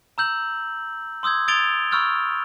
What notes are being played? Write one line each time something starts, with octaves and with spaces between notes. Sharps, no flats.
A#5 E6 G6 F#7
C6 D#6 E6 G6 G#6
D#6 G#6 A6 D7 F7 G7
B5 C#6 E6 F6 G6 A6